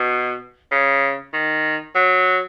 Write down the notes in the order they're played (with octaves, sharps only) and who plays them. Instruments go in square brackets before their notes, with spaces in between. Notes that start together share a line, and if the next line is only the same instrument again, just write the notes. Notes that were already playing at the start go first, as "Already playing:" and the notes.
Already playing: [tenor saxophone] B2
C#3
D#3
F#3